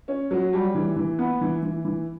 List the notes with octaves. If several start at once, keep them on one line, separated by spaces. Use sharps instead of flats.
C#4
F#3
G3
E3
E3
B3
E3
E3
E3